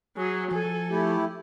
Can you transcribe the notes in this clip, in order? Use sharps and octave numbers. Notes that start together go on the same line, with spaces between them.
F#3 G#4
F3 A4 G#5
A3 E4 G4